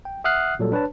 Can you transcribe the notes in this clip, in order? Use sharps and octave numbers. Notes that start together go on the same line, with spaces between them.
G5
E5 F#5 D#6 F6 F#6 C7
A#2 F#3 G3 A4
D4 B4 C#5 A5